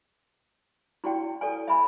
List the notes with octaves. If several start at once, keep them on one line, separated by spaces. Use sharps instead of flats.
E4 F#4 D5 G5
A4 D5 G#5
E5 G#5 B5